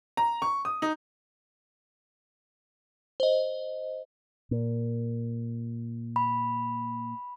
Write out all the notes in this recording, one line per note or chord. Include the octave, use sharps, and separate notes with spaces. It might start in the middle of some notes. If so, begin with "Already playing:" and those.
A#5
C#6
D#6
D#4
C5 D#5
A#2
B5